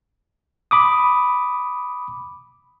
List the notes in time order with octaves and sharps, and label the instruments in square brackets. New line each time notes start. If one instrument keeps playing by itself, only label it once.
[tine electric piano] B5 D6 D#6